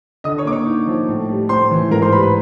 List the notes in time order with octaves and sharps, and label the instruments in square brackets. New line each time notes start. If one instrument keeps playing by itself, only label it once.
[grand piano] D3 D#5 D#6
C#5 C#6
A#3 D6
C#5 C#6
D#4
F3
A2
G3
A2 C5 C6
E3
G#2 A#4 A#5
C5 C6
G3 B4 B5
B4 B5